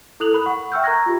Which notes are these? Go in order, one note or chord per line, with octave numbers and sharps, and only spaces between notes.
E4 A4 D#6 F#6 F7 F#7
A#4 B5 F#6
F#5 C#6
E5 G5 C#6 E6 F6 G6
A#4 A#5 C#6 F#6 G#6 A#6
F4 G4